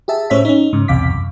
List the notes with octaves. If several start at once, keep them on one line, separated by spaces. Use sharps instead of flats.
G4 G#4 E5 A5
A2 C#4 C5 C#5 E5 B6
C#4 D#4
G#2 C#3
B1 E2 C3 F5 D6 B6
F#2